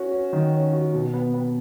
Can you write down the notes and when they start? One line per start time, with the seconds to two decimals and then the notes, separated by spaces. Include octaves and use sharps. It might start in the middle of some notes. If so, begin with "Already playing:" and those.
Already playing: C#4 F#4
0.12 C#4
0.33 D#3
0.52 C#4
0.73 F#4
0.93 B2
1.14 B3
1.34 B3